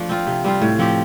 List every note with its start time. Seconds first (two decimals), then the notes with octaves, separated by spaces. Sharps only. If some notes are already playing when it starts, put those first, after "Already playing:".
Already playing: F3 A3 D4
0.09 C4 F4
0.27 C3
0.44 G3 C4 F4
0.62 A2
0.79 F3 C4 G4